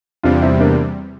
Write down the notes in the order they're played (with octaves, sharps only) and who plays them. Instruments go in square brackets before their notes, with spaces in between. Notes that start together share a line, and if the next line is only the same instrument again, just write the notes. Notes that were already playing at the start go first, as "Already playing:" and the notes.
[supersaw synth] E2 C3 G3 [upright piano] D4 F4
[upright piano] C4 E4
A#3 D4